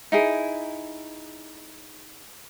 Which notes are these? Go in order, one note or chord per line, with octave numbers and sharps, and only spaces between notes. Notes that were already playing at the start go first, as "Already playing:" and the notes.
D#4 E4 G#4